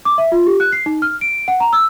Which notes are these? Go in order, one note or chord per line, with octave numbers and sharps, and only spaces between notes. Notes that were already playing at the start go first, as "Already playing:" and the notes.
D6
E5
F4
G4
F#6
C7
D#4
F6
D7
F#5
A#5
E6